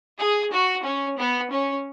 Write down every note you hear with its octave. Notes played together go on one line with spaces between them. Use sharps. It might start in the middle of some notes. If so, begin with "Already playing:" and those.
G#4
F#4
C#4
B3
C#4